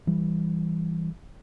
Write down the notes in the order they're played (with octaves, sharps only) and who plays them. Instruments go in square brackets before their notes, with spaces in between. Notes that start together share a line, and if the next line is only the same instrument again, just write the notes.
[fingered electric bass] E3 G3